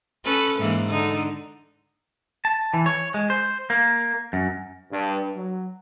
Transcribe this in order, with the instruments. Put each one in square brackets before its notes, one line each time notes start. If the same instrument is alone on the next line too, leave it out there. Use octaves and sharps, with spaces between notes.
[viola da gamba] C#4 A4 B4
G#2 E3 A#3
D3 D#4
[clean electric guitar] A5
E3
C#5
G#3
C5
A#3
F#2
[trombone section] G2
F#3